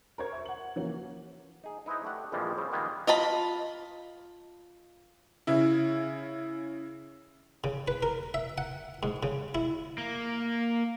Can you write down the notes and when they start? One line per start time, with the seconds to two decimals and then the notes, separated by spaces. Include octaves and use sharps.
0.18 A#4 C5 C#5 G#6
0.32 E5 C#6
0.45 F#5 F#7
0.76 E3 A#3 C#4
1.64 D#4 G#4
1.86 D#4 E4 B4 C5 D#5
2.03 A3 D4 G4 F#5
2.32 A#1 F2 E3 F3 G3 G#3
2.57 C#3 G3 C4
2.72 A#2 D#3 G3 G#3 A#3 B3
3.07 F4 D#5 A5 B5
5.47 C#3 E4
7.64 C#3
7.88 B4
8.03 A#4
8.34 E5
8.58 F#5
9.03 G#2
9.23 C#3
9.55 E4
9.98 A#3